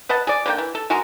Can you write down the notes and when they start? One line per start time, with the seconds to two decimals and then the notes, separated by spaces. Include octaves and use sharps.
0.09 B4 D#5 F#5 A5
0.27 G#4 D5
0.46 D3 A#3 G5
0.58 E3
0.75 A4
0.90 G#3 F#4 G#4 A#4